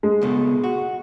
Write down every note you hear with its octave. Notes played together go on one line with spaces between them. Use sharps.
G#3
C#2 B2 A3
F#4